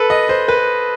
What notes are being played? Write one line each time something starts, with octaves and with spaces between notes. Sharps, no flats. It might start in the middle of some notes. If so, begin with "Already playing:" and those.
Already playing: A4 B4
D#5
C5
B4